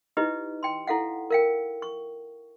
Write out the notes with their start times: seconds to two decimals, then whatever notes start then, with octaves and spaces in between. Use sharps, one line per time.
0.17 D#4 E4 G4 B4 D#5
0.63 G5 C6
0.87 E4 A4 F5 F#5
1.30 A#4 F5 G5
1.82 C#6